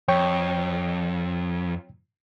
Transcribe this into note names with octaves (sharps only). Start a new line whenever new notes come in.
F2 C#5 G5 C#6